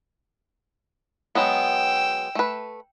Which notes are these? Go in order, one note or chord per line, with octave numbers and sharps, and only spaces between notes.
F#3 G#3 B3 G5 E6
A3 B4